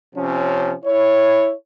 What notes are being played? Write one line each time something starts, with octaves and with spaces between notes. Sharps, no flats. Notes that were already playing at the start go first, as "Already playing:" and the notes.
C3 F3 C#4
E4 C#5